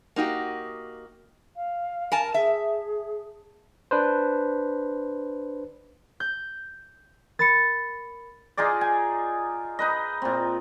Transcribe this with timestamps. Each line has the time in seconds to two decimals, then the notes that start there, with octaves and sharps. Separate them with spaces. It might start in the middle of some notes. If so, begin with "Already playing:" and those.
0.16 A#3 D#4 F#4 G4
1.56 F5
2.12 A#4 G#5 A5
2.34 G#4 E5
3.91 D4 B4 C5
6.20 G6
7.39 A#4 B5 A6 C#7
8.57 D#4 F4 G#4 D5
8.81 G#5
9.79 D#4 B4 D#5
10.22 A#2 C4